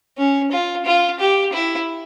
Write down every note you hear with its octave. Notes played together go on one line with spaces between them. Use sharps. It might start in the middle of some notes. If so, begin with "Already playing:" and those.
C#4
F4
F4
G4
E4